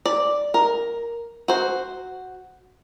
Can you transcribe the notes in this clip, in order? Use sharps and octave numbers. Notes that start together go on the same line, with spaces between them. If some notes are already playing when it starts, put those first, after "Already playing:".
D5
A#4
F#4 C5